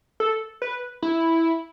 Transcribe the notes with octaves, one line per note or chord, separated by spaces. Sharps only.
A4
B4
E4